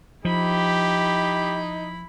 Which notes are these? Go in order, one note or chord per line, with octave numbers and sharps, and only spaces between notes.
F3 D#4 E4 G4 B5